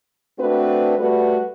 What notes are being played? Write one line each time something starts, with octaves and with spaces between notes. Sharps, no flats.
A3 C4 D4 F#4 B4
G3 A3 F#4 B4